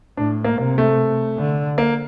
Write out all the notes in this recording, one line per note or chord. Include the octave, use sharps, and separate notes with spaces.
A2 D4
A#3
C3 A#3
A3
D3
A#3